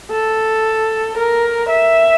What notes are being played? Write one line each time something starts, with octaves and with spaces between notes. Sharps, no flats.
A4
A#4
E5